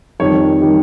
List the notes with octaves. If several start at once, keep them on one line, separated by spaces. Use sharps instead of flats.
F2 D#3 G3 C#5
D#3 G3